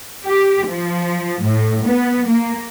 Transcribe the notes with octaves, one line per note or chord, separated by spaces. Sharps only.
G4
F3
A2
B3
A#3